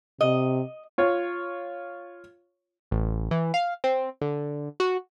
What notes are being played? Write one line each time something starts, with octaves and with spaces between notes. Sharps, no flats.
C3 D#5
F4 C#5
A1
E3
F5
C4
D3
F#4